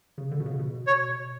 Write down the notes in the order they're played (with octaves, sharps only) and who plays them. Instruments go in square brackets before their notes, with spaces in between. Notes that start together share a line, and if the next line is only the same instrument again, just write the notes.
[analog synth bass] C#3
D3
B2
C#3
B2
[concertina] C#5